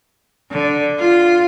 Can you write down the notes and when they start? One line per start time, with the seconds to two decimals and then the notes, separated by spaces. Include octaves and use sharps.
0.52 D3
0.99 F4